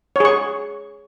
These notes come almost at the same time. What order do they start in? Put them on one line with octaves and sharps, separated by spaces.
C#5 G#4 C#6